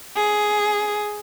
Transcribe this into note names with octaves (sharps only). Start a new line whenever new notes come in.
G#4